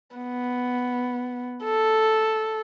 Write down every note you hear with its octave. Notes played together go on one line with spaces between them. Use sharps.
B3
A4